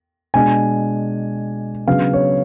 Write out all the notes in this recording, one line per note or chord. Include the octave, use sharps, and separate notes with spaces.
B2 G#3 D4 G#5
C#3 F#3 B3 D4 F5
C#5